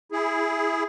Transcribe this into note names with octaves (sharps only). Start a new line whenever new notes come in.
E4 G#4